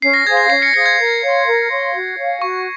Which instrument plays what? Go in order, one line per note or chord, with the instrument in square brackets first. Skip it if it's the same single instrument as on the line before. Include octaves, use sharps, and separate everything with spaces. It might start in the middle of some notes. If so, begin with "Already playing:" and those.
[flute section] C#4 [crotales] C7
[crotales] A#6
[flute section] G#4 C5 F5 [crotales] G#6
[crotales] A#6
[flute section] C#4 [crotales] C7
[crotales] A#6 C#7
[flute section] G#4 C5 F5 [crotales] A#6
[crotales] G#6
[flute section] A#4
C#5 F5 C6
A#4
C#5 F5 C6
F#4
C#5 F5 G#5
[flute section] F#4 [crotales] C#6